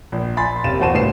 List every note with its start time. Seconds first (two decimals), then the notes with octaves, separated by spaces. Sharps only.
0.12 A#1
0.37 G#5 B5 C6 A6
0.64 F#1 C3 C4 F5 D#7 E7
0.80 E2 F#4 C5 A5 D#7 E7
0.93 C2 A2 D4 B4 C7 E7